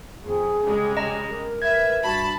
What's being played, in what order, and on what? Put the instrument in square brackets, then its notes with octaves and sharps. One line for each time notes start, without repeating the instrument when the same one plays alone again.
[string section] F2 [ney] G#4
[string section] C#3 G3 G#3
[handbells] D#5 A#5
[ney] A#4
[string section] B4 E5 [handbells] G#6
[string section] G2 A5 B5 [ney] F#4